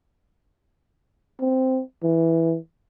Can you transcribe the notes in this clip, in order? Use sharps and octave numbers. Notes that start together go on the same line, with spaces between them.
C4
E3